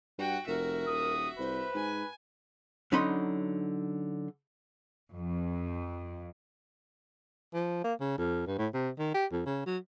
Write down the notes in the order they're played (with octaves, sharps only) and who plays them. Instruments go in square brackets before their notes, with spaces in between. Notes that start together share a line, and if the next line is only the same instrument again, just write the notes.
[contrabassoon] G2 [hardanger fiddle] F#4 G5 [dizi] F#5
[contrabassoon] F1 [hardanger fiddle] F#4 E5 [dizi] A#4
[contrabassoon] D#1 [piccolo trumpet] D#6
[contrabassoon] C2 [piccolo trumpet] B4 [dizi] C5
[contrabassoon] G#2 [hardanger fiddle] G#5
[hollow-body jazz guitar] D3 F#3 C#4 D#4 B5 C6
[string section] F2
[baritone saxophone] F3
A#3
C#3
F2
G2
A2
C3
D#3
G4
F2
C#3
F#3